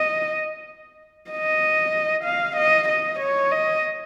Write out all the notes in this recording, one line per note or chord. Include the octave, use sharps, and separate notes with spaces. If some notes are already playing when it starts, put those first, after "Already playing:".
Already playing: D#5
D#5
F5
D#5
D#5
C#5
D#5